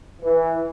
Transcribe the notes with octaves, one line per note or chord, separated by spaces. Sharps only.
E3